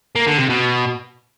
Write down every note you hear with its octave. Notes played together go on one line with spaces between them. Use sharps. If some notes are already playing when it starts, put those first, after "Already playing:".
A#3
D3
C3
B2